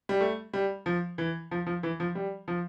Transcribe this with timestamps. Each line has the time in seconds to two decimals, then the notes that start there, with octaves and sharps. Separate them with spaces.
0.09 G3
0.21 A3
0.54 G3
0.86 F3
1.18 E3
1.51 F3
1.66 F3
1.83 E3
2.00 F3
2.15 G3
2.48 F3